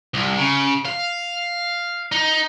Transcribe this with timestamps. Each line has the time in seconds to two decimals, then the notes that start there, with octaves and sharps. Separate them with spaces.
0.14 C2
0.38 C#3
0.85 F5
2.12 D#4